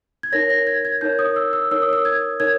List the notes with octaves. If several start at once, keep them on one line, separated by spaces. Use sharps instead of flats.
G#6
D#4 A#4 C#5 A#6
A#6
G#6
G#6
D#4 A#4 C#5 G6
D#6
E6
E6
D#4 A#4 C#5 E6
D#6
E6
G#6
D#4 A#4 C#5 G#6